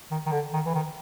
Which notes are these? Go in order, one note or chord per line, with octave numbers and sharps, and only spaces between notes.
D#3
D#3
D3
D#3
E3
D#3